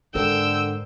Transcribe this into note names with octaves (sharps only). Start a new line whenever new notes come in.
G#2 D3 A4 A#4 C5 G5 E6